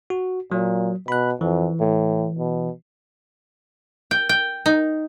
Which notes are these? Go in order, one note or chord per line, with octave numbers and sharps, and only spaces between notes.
F#4
A#2 F#3
B2 B5 F#6
F2 E3
A2
B2
G5
G5
D#4